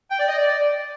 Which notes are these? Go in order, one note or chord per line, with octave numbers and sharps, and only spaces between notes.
G5
D5
D#5
D5